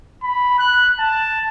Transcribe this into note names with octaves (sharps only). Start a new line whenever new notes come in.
B5
F#6
A5